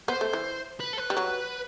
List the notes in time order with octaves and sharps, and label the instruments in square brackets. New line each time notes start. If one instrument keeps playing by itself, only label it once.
[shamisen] B3 [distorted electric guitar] C5
[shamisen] A3
E3
[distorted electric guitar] B4
A4
B4
[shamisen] G3
F#3